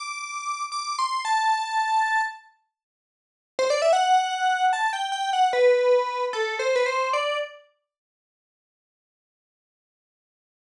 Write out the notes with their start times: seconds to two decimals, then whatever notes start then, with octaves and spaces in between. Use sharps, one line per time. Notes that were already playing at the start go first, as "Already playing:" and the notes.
Already playing: D6
0.72 D6
0.99 C6
1.25 A5
3.59 C5
3.70 D5
3.82 E5
3.93 F#5
4.73 A5
4.93 G5
5.12 G5
5.33 F#5
5.53 B4
6.33 A4
6.59 C5
6.76 B4
6.86 C5
7.13 D5